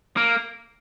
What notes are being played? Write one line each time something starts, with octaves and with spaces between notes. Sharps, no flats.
A#3